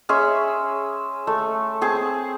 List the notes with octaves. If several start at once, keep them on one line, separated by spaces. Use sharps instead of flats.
C#4 G#4 E5 C6
A3
C4 G#4 A5